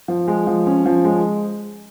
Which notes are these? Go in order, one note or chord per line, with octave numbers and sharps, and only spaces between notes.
F3
G#3
F3
C#4
F3
G#3